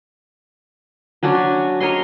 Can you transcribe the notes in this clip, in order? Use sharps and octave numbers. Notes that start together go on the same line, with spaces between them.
F#3 C#4 D4 F#4
G#5
A#4 C#5 D#5 C6